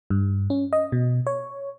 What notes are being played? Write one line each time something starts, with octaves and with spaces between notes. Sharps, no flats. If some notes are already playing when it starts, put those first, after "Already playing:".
G2
C#4
D#5
B2
C#5